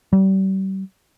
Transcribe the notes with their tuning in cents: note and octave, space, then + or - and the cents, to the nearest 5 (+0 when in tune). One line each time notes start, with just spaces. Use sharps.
G3 -35